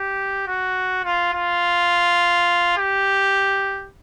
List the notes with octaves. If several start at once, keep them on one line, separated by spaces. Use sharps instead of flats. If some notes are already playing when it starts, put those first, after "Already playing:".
Already playing: G4
F#4
F4
F4
G4